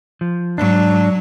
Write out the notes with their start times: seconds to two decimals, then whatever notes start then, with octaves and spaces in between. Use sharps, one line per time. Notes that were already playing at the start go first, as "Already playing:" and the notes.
0.21 F3
0.58 F2 G#2 F#3 D4